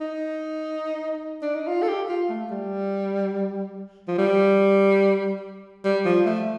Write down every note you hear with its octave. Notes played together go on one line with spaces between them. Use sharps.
D#4
D4
D#4
F4
A4
G4
F4
A3
G3
F3
G3
G3
F3
A3